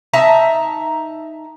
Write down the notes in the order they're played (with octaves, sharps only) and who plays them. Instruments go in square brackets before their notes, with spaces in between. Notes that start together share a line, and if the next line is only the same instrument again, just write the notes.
[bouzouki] D#4 E5 A5 A#5